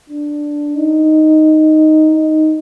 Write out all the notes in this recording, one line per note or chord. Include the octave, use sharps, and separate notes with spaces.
D4
D#4
D#4